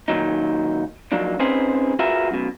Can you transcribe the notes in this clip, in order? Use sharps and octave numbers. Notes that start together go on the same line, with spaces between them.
A#2 D#3 F#3 D#4
F3 F#3 A#3 D4 D#4
C4 C#4 D#4 G#4 B4 C5
F4 F#4 G#4 A#4 B4 E5
F#2 B2